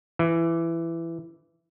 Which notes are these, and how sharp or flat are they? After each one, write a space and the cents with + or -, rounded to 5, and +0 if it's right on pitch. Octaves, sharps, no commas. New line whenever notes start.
E3 +15